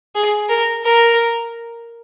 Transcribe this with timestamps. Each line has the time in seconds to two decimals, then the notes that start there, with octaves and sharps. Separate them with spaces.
0.15 G#4
0.49 A#4
0.84 A#4